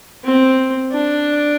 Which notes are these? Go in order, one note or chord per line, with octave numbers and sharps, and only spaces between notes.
C4
D4